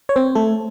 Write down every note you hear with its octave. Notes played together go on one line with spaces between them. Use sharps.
C#5
C4 C5
A3 A4